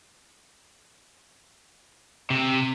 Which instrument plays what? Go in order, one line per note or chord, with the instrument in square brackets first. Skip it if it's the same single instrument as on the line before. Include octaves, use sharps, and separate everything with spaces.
[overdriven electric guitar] C3